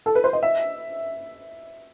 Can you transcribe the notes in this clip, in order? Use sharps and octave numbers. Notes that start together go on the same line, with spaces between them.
A4
B4
C5
D#5
E5